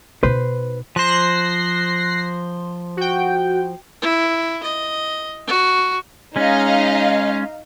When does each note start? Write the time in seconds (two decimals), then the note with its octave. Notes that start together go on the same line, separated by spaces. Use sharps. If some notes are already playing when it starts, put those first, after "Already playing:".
0.23 B2 D#4 B4 C5
0.96 F3 C5 F#6 A#6 C7
2.97 F#4 G5
4.02 E4
4.63 D#5
5.47 F#4
6.36 G#3 C#4 D#4 D#5 F5